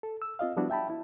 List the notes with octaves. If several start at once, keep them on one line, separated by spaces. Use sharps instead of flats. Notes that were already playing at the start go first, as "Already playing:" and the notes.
A4
E6
C4 F4 D#5 F5
F3 G3 B3 D4 E4 F#4
E5 G5 A5 B5
E4